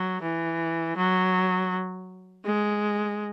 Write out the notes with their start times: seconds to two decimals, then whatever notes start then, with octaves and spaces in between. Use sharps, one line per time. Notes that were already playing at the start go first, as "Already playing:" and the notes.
Already playing: F#3
0.22 E3
0.97 F#3
2.45 G#3